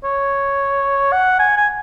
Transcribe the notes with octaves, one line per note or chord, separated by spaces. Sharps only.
C#5
F#5
G#5
G#5